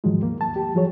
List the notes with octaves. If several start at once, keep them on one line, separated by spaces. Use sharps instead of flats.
G#2 D#3 F3 F#3 G#3
D#2 A#3
A5
G4
F3 F#3 G#4 C#5